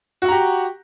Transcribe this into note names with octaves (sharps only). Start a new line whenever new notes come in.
F#4 G4 F#5 A#5